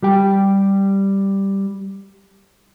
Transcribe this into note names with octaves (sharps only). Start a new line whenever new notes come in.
G3 G4 G5